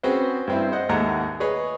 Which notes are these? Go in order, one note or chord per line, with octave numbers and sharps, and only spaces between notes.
C4 C#4 F#4 G#4 B4 C5
G2 C4 E4
C5 D#5 F#5
D#2 G#2 A3 F#5 A#5
G#4 B4 C#5 D#5